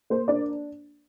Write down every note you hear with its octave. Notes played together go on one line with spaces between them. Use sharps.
A#3 C5
D4 D5